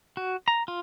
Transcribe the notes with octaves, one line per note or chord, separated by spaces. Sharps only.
F#4
A#5
F4